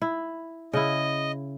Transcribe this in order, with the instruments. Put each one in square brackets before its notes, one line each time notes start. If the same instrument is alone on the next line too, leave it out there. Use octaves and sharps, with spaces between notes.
[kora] E4
[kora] C#3 E4 [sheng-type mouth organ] D#5